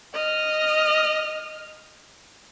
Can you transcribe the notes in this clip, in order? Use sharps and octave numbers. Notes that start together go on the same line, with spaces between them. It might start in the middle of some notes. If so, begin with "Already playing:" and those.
D#5 F6